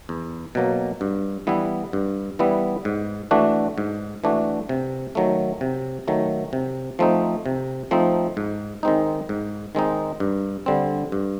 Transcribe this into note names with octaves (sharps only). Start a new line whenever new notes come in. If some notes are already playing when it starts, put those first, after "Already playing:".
E2
B2 F#3 A#3
G2
E3 G3 B3 E4
G2
E3 G3 B3 E4
G#2
E3 A3 D4 F#4
G#2
E3 A3 D4 F#4
C3
D#3 F#3 A3
C3
D#3 F#3 A3
C3
F3 A3 C4 D#4
C3
F3 A3 C4 D#4
G#2
D#3 G#3 C4 D#4
G#2
D#3 G#3 C4 D#4
G2
D3 G3 C4
G2